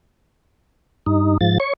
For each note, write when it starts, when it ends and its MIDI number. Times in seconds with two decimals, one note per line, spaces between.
1.06 1.38 43
1.06 1.38 63
1.41 1.58 44
1.41 1.58 53
1.41 1.58 93
1.60 1.73 73
1.60 1.73 85